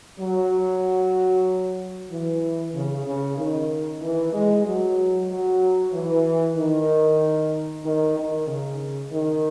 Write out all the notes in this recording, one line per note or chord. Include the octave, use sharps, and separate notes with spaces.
F#3
E3
C#3
C#3
D#3
E3
G#3
F#3
F#3
E3
D#3
D#3
D#3
C#3
D#3